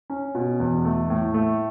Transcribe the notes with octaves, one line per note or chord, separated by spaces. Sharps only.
C#4
B2
E2
A3
A2
A3